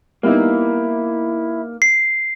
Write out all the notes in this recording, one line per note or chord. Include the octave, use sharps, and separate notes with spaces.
G3 A#3 B3 D#4 E4
C7